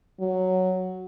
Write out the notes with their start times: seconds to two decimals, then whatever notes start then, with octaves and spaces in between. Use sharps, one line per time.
0.20 F#3